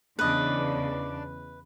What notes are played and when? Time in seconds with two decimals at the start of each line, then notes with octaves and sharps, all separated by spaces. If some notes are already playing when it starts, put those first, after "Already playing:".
0.19 E2 C#3 D4 B4 D5 D#5